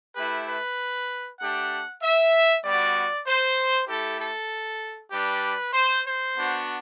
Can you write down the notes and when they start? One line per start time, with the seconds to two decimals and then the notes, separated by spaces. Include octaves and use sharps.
0.16 A3 E4 G4 B4
0.47 B4
1.40 A3 D4 G4 F#5
2.02 E5
2.63 G3 B3 F#4 D5
3.26 C5
3.87 A3 E4 G4 A4
4.20 A4
5.12 G3 D4 G4 B4
5.74 C5
6.05 C5
6.36 B3 D4 F#4